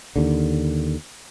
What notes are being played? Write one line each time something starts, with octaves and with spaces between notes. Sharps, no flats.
D#2 D3